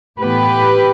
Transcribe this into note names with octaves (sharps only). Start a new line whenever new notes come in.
A2 E3 B3 G4 B4